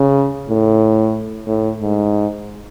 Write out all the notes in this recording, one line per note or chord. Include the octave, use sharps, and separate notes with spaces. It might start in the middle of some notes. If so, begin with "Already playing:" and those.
Already playing: C#3
A2
A2
G#2